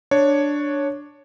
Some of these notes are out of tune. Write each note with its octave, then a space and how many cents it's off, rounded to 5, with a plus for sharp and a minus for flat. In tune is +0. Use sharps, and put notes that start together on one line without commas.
D4 +0 C#5 +0